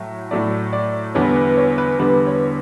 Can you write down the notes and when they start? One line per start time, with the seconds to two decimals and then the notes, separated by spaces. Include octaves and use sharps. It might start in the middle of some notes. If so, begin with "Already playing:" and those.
Already playing: A2 F#3 A3
0.31 A2 F#3 A3 D5
0.73 D5
1.15 E2 D3 G3 B3 C#5
1.36 B4
1.57 C#5
1.78 B4
1.99 E2 D3 G3 B3 B4
2.27 C#5